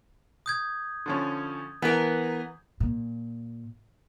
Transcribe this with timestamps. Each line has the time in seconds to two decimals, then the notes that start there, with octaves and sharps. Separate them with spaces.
0.46 D#6 G6 G#6
1.06 D3 F3 C#4
1.82 E3 B3 A#4
2.80 A#2